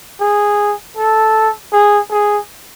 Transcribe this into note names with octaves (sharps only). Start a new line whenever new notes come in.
G#4
A4
G#4
G#4